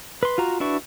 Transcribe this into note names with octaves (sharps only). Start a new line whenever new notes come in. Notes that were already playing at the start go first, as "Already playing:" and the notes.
B4 C6
F4 F#4 A#5
D4 E4 F#4 B4 C#6